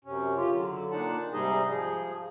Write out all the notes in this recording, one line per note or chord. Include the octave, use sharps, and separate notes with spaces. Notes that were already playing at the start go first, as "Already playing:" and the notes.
F#2 C3 C#4
C#3 F4 G4
D3 F#3
A#2 D4 D#4 F#5 A5
G#2 C3 G3 D#4 G#4 D#5
F3 G#4